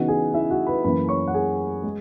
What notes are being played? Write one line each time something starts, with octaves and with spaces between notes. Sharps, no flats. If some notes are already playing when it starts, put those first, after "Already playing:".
Already playing: C#3 E3 B3 D#4 F#4 F#5
G#4 G#5
E4 E5
F#4 F#5
B4 B5
F#2 E3 A#3 B4 B5
C#5 C#6
F#5
G#4 G#5
G#3